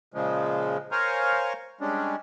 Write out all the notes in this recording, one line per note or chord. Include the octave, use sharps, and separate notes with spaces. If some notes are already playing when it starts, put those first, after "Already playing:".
A#2 C#3 F3 G#3
A#4 C5 C#5 F5 G#5 A#5
G3 G#3 C#4 D4